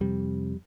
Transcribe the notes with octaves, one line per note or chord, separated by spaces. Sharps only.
F2 C3 G3